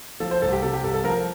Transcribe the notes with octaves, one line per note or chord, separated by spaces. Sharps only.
F3 A4
C5
C2 A4
G4
C3 A4
G4
C2 A4
A4
F3 A#4